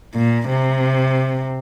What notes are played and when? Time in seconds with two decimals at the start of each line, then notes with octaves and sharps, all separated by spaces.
0.15 A#2
0.49 C3